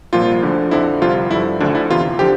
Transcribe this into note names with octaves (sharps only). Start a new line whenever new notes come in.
C2 A#2 F3 F4
D2 D3 F3
F2 D3 F3 E4
C2 C3 F3 F4
G2 D3 F3 E4
D2 D3 F3 D4
E4
E2 C3 E3 F4
D3 F3 G4